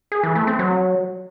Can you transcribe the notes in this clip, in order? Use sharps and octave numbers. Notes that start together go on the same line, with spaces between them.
G#4
E3
A3
C4
F#3